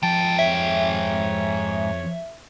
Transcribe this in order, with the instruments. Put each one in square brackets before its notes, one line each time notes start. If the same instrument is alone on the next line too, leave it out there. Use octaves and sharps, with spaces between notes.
[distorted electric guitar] F2 [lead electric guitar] G#2 G5 [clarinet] A5
[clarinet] C#5 [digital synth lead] E5